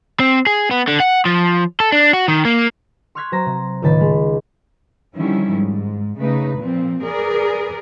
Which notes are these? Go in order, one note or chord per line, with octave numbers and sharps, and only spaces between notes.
C4
G#4
B3
D3
F#5
F3
A4
D4
F#4
D#3
A#3
C6 C#6 F6 F#6 G#6 B6
F#3 C5 A#5 A#6 B6
C3
C#2 A2 D#3 A5 B5
G#3
D3 D#3 F3 G3 C#4 E4
G#2
C#3 A3 D#4 B4
A#2 F3 C4
G#4 A#4 B4 D5